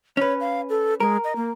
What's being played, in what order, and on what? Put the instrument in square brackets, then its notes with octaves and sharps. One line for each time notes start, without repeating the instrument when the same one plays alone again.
[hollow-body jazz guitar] C#4 B4 [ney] C#5
[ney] F5
A4
[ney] G#3 [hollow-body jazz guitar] A#4
[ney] D#5
A#3